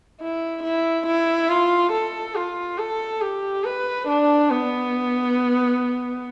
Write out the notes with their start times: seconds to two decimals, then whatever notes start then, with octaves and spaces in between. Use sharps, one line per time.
0.21 E4
0.64 E4
1.07 E4
1.50 F4
1.93 A4
2.36 F4
2.78 A4
3.22 G4
3.64 B4
4.08 D4
4.51 B3